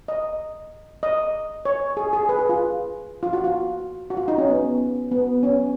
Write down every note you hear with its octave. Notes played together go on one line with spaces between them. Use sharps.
D#5
D#5
C#5
G#4
G#4
B4
G#4
F4
F4
F#4
F4
F#4
F4
D#4
C#4
B3
B3
C#4